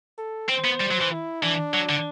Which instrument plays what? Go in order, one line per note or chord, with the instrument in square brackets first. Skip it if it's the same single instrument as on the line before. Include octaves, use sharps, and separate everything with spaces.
[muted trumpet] A4
[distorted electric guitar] C4 [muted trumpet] C5
[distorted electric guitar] B3
G3
F#3
E3
[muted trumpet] E4
[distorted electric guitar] E3 [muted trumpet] D4
[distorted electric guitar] F#3
D3